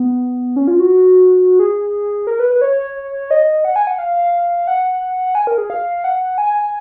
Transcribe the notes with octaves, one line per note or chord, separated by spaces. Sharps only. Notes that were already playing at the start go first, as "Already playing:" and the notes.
Already playing: B3
C#4
F4
F#4
G#4
A#4
B4
B4
C#5
D#5
F#5
G#5
F#5
F5
F#5
G#5
A#4
G#4
F5
F#5
G#5